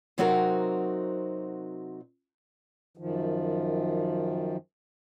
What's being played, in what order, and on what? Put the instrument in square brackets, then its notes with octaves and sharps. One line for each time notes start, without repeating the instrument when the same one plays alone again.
[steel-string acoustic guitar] C3 F#3 C4 D#4 F#4 A#4
[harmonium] F#2 D#3 F3